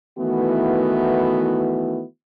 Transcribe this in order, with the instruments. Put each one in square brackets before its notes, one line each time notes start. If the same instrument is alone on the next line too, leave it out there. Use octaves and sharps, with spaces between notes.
[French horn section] D#3 E3 A3 B3 E4 F#4